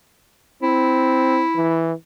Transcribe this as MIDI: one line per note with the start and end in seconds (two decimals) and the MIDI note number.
0.62 1.43 60
0.62 1.86 64
1.55 1.93 52